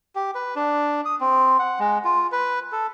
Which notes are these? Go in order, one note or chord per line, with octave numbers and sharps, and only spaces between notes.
G4
B4
D4
D#6
C4
F#5
G#3
F4
B4
A4